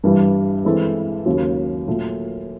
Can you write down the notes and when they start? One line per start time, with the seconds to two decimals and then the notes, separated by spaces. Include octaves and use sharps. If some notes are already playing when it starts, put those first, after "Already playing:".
0.04 G2 E3 G3
0.65 E3 G#3 C4 E4 A4
1.26 D#2 C#3 F#3
1.88 A#2 F#3 A3